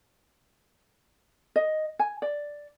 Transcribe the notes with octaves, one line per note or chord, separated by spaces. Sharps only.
D#5
G#5
D5